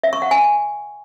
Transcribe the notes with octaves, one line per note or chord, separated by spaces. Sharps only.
E5
C#6
F#5
G#5